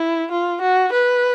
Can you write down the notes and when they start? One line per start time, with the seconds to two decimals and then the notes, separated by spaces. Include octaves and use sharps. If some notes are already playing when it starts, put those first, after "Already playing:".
Already playing: E4
0.31 F4
0.61 F#4
0.92 B4